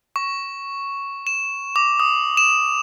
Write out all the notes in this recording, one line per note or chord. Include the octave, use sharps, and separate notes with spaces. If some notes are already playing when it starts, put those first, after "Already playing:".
C#6
E7
D6
D#6
E7